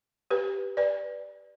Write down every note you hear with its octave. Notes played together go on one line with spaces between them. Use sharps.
G4 B4
B4 D5